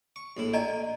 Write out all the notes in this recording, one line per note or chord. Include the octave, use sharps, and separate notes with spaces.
C#6
A#1 A2 E4
D5 D#5 G5 G#5 A#5